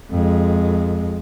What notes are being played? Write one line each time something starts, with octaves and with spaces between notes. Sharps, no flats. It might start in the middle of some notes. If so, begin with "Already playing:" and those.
F2 G#3